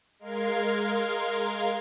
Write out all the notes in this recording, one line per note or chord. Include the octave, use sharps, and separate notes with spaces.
G#3 A#4 F5 C6 G#6